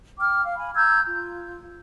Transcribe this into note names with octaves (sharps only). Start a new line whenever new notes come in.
G5 D6 F6
F5
G#5 B5
A#5 E6 G6 G#6
F4